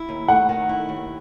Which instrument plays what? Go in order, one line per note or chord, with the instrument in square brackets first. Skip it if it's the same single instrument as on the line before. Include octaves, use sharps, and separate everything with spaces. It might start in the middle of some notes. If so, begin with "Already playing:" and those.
Already playing: [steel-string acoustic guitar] E4
D#2
[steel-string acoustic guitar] A3 [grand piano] F#5
[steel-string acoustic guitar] D#3
E4
D#2